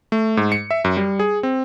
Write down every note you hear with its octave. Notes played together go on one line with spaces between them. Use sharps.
A3
G#2
C#7
E5
F#2
G3
G#4
C4